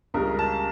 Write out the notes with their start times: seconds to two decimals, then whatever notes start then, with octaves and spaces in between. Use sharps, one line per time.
0.14 C#2 C#3 G3 A#4
0.39 A5